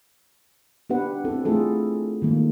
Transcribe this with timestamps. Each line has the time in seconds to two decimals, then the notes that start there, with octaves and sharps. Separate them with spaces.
0.90 B3 D4 G4 B4 F#5
1.24 C4 E4 A4
1.45 A3 D4 E4 F4 G#4 A4
2.22 D#3 G#3 A#3